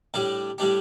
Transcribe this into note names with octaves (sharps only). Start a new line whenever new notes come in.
A2 G3 D4 G4
A2 G3 D4 G4